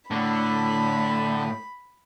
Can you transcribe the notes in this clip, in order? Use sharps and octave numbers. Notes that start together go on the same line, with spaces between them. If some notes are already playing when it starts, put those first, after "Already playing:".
A2 D3 B5